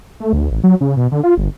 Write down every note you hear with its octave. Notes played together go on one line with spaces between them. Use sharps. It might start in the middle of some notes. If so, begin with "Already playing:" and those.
A3
D2
A1
F#3
C#3
B2
D3
F4
G1